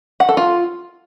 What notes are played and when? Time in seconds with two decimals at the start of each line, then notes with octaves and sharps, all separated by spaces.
0.20 F#5
0.29 A4
0.37 F4